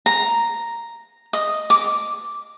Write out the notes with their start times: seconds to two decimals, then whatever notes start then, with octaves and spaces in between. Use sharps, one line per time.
0.06 A#5
1.33 D#5
1.70 D6